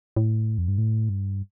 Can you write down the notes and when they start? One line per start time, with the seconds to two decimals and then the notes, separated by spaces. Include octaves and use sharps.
0.16 A2
0.58 F2
0.68 G2
0.78 A2
1.09 G2